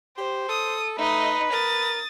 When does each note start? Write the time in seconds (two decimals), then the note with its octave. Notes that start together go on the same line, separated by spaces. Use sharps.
0.18 G4 C5
0.49 A4 D#6
0.98 A3 D#4 B4 D#5
1.53 A#4 D#6 A6